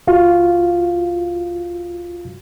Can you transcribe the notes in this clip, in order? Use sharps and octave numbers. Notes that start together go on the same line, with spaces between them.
C#2 F4 F#4 F5